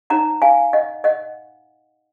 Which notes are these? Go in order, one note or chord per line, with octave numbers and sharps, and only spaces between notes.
D#4 A#4 C#5 F#5 A#5
F5 G#5
D#5 F#5
D#5 F#5